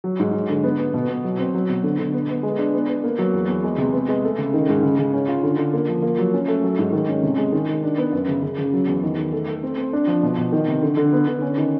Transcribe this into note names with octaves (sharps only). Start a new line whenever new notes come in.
F#3
G#2
F#3
D3
B3
B3
B2
B3
F#3
C4
F#3
B2
D3
D3
B3
B3
G#3
D4
B3
B3
A#3
F#3
E2
E2
G#3
C3
B3
G#3
A3
C#3
D#3
G#2
C#3
C#3
C#4
F4
D3
D3
A#3
F3
A#3
F#3
C#4
A3
F#3
G#2
D#3
C#4
C3
G#3
D#3
D#3
D4
B3
F#2
C#3
C#3
C#3
F#3
E2
D#3
D#3
A3
A3
C4
C4
D4
F3
B2
B2
D#3
C3
D3
D3
B3
D3
C#4
D#3